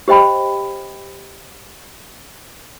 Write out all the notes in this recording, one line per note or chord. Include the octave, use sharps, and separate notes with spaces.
G4 C5 D#5 G5 B5